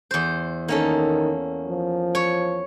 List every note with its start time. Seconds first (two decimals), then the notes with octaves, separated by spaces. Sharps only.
0.11 E2 C5
0.68 D#3 A#3 C#4 A4
1.68 F3
2.15 C#5